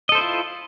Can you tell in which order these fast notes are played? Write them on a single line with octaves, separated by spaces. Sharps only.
D#5 A4 C5 E4 F4